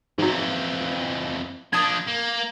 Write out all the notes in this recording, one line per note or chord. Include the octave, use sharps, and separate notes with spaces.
F2 G#2 E3 F#3
F3 D4 A5 D#6 G#6
A#3